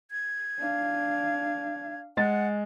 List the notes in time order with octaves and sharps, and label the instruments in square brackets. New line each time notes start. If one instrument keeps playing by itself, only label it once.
[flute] G#6
[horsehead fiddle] D4 F5
[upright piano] G#3 A6 [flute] F#5